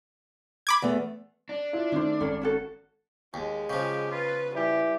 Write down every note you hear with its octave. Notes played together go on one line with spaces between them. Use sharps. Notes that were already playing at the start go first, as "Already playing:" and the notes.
B5 D6 G#6
E2 A3
D4
E4 F4
D#3 A3 C#4 C5
G#1 C#4 A4
C#4 F#4 A4
D#2 G#3
C#3 F3 G4
F4 B4
E3 G3 G4